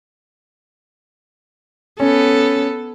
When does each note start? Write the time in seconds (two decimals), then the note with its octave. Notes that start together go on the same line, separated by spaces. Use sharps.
2.00 B3 C#4 A4